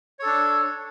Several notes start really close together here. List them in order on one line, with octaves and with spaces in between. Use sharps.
C#5 A4 D4